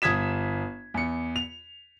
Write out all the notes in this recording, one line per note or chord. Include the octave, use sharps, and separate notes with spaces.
G1 D#6 G#6 B6 E7
E2 C#7
F7